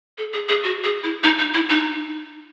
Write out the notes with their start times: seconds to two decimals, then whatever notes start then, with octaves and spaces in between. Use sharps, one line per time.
0.18 A4
0.33 G#4
0.49 G#4
0.64 F#4
0.84 G#4
1.04 E4
1.23 D#4
1.39 D#4
1.54 E4
1.69 D#4